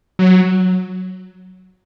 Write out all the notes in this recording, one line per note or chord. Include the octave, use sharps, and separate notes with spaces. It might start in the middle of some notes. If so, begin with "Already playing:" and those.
F#3